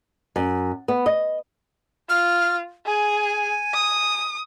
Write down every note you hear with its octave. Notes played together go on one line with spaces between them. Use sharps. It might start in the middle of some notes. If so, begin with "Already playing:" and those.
F#2
B3
D#5
F4 F6
G#4 G#5
D#6